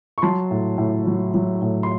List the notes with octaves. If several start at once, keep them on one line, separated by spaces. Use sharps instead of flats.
C#6
F#3 A5 C6
A2
A2
F#3
F#3
A2
C6